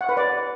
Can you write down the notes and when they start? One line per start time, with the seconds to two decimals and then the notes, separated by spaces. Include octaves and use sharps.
0.01 F#5
0.09 B4
0.17 D5